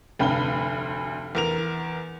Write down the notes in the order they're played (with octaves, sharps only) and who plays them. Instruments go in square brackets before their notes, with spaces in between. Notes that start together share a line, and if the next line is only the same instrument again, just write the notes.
[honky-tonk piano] F1 G2 G5 [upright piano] D2 B5 G7
[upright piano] E2 A#4 F7